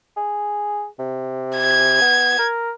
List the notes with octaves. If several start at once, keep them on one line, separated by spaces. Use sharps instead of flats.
G#4
C3
G#6
B3
A#4